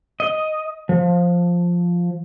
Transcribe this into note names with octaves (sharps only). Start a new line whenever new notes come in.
D#5
F3